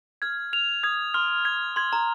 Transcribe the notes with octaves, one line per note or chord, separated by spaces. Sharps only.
F6 G#6
F6 F7
D#6 G#6
C6 F6
G#6
C6 G#6
A#5